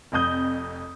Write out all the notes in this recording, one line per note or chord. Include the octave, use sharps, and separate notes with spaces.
F1 F2 D#5 D#6 G6